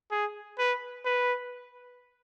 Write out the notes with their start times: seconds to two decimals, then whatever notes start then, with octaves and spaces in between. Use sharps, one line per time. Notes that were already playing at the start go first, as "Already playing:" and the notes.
0.11 G#4
0.59 B4
1.05 B4